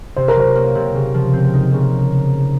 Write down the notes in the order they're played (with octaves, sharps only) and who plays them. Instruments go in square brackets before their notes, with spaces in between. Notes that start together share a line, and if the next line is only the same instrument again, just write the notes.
[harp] C3 [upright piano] C5
[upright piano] A#4
[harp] F#3 [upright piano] C5
[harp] A#3
C3
C#3
F3
C4
D#4
C#3